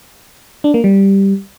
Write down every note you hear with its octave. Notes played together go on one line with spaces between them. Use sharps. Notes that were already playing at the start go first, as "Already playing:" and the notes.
D4
A#3
G3